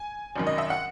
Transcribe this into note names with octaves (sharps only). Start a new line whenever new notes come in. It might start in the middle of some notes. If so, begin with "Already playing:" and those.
Already playing: G#5
G#1 F#2 D#3
D#5
E5
F#5